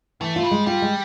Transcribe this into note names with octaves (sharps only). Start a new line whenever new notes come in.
E3 A3
F4
G3
G#3
G3 F4
G#3